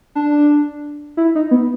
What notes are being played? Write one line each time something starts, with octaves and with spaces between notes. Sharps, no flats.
D4
E4
D#4
B3